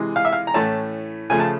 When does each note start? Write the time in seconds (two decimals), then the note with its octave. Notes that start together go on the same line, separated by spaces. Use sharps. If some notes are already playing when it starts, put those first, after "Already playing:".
Already playing: C3 E3 G#3
0.16 F5
0.25 E5
0.33 F5
0.47 A#5
0.54 A2 E3 A3 C#4 A5
1.30 C#3 F3 A3 G#5
1.40 A5